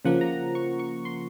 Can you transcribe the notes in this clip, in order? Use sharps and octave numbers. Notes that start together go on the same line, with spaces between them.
C#3 F3 A#3 F#5
A#5
C#6
C#6
C6